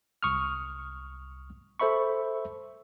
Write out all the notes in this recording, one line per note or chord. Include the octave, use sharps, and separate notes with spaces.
C2 C#6 D#6 F6
A4 C5 E5 B5 C#6